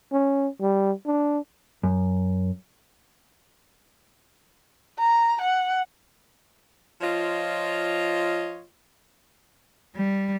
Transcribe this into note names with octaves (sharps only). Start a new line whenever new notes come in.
C#4
G3
D4
F#2
A#5
F#5
F3 F4 C#5 D#5
G3